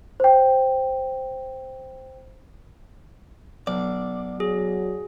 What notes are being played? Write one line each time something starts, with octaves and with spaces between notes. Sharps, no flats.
C5 G5
B1 D5
F#3 G#4